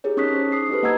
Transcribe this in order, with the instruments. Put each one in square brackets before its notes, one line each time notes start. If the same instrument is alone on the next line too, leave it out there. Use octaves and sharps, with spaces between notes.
[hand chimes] E4 G4 G#4 A#4 C#5
C#4 D#4 C#6 D#6 F#6 B6
C5
C#6 D#6 C7
D#4 E4 G4 A4 B4
A#3 D#5 F#5 A#5 E6 G#6